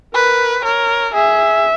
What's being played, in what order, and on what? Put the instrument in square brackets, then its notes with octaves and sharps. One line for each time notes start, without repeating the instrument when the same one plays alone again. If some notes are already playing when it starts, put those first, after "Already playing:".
[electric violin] A#4 [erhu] B4
[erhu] A#4 [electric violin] C#5
[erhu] G#4 [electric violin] E5